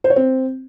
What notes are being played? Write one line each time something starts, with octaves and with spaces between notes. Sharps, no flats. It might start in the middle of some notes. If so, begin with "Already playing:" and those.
C5
C#5
C4